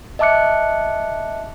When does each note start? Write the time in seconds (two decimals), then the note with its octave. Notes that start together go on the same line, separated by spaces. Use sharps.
0.19 D#5 E5 A5 D6 F#6 C#7